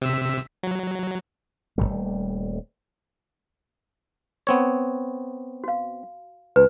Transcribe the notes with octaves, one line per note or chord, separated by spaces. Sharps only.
C3 E6 B6
F#3
D#1 F#2 G3 A3
B3 C4 C#5
F#4 F5
C#2 B4